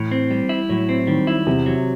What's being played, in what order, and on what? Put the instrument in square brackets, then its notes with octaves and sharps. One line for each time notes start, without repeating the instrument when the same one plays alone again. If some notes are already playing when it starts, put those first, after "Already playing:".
Already playing: [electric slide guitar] A2 [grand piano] E3
[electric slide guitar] C4
G3
E4
[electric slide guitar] A2 [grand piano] F#3
[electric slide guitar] C4
[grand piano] D#3 [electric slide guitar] G3
[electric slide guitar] E4
[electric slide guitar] E2 [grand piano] C3
[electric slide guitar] F#3